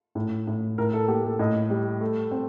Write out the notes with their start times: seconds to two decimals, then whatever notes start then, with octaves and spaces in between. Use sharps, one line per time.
0.15 A2
0.47 A2
0.78 A2 A#4
0.93 A4
1.08 A#3 G4
1.24 A4
1.39 A2 D#5
1.70 G3
2.01 A3
2.31 C4